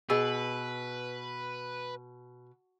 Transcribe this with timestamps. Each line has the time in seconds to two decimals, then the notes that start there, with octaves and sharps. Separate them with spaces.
0.10 B2 G#4 B4 D#5 E6